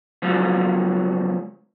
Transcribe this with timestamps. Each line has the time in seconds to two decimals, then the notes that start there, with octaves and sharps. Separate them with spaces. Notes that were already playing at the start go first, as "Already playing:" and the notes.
0.22 C#2 F3 F#3